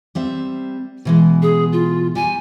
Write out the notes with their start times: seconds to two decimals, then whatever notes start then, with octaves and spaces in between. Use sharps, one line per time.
0.15 G3 C4 E5
1.05 B2 E3 G#3
1.42 G#4
1.72 F4
2.15 G3 G#5